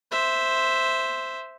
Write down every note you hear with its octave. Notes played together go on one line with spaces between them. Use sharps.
C5 E5